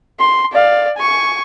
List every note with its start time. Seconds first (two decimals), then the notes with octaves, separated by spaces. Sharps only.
0.20 C6
0.53 D5 F5
0.97 G#5 C#6